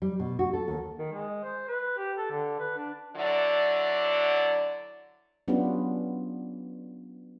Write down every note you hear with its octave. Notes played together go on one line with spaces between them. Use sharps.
G3
B2
F#4
A4
D#2
D#3
G#3
C5
B4
G4
A4
D3
B4
D4
D3 F#3 E4 D5
F#3 B3 C#4 D4 F4 G4